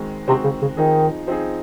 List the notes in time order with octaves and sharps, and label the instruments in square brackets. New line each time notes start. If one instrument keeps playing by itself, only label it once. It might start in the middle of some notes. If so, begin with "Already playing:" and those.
Already playing: [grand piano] D#3 G#3 C4 F#4
[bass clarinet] C3 [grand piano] D#3 G#3 C4 F#4
[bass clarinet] C#3
C#3
[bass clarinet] D#3 [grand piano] F3 C4 D#4 G#4
[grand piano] F3 C4 D#4 G#4